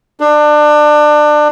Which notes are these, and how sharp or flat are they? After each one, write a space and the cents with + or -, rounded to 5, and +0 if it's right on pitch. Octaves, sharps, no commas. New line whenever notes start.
D4 +25